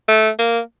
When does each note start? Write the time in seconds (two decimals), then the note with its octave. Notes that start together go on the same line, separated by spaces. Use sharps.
0.08 A3
0.39 A#3